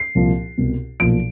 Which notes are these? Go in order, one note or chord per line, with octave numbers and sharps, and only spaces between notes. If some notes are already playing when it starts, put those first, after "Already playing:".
Already playing: C7
C2 A#2 F3
C2 B2
B1 A#2 F3 D7